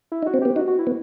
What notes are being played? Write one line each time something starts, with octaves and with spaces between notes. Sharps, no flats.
E4
D#4
F#4
C4
B3 G4
D#4 F#4
F#4
E4
B3